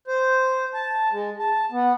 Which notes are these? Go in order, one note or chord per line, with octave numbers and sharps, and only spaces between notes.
C5
A5
G#3
A5
B3